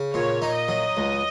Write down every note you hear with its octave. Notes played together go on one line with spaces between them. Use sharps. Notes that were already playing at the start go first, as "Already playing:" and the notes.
Already playing: C#3
A#2 C#5
D#4
D#5
F#3
C#2